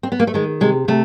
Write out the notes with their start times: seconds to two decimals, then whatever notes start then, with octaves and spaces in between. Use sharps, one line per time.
0.03 C4
0.12 B3
0.20 A#3
0.27 A3
0.34 D#3 G#3
0.61 C3 G#3
0.88 C3 A3